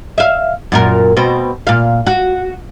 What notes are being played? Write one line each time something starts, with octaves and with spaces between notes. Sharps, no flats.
E5 F5
F#2 A#2 A#4
B2 C4
A#2 F5
F#4